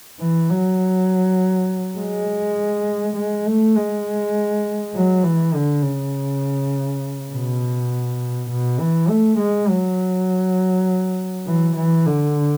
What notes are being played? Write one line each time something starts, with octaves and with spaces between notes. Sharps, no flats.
E3
F#3
G#3
G#3
A3
G#3
F#3
E3
D3
C#3
B2
B2
E3
A3
G#3
F#3
E3
E3
D3